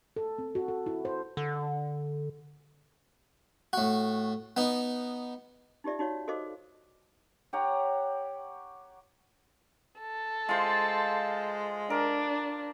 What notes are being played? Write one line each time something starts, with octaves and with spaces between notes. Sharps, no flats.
A4
C4
F#4
A4
E4
C5
D3
A2 F#4
B3 D#4
D#4 F4 G4 D5 E5
D#4 F#4 C#5 F5
F#4 A4 C5 D#5 F5 D6
G4 C#5 F#5 A#5
A4
G#3 F4 C5
D4 A#4